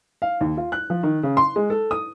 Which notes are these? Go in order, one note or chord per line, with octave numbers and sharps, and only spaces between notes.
F5
D#2
F4
F#6
F3
D#3
C#3
C6
G#3
A4
D#6